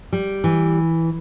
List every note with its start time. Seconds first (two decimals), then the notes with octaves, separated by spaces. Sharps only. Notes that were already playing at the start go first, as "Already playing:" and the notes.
0.13 G3
0.44 E3